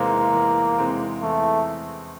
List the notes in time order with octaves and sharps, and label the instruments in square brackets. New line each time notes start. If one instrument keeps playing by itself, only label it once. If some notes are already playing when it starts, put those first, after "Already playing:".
Already playing: [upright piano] E2 C3 E3 G#3 C4 [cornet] A#3
[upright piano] E2
C3 E3 G#3 C4
[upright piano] E2 [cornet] A3